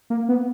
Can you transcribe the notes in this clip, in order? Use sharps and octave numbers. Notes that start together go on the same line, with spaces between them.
A#3
B3